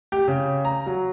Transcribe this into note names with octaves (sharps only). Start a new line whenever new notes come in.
G4
C#3
A#5
F#3